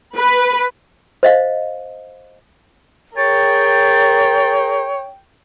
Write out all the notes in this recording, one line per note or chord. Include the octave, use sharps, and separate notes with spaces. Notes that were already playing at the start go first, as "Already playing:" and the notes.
B4
C5 D#5 F5
G#4 A#4 C#5 G5 A6